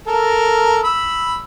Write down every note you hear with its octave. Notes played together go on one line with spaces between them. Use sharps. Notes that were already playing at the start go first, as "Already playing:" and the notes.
A4 A#4
B5 E6